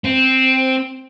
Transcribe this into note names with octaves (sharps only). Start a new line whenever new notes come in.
C4